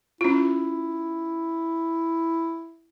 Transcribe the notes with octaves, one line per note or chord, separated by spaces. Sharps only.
C#4 E4 F4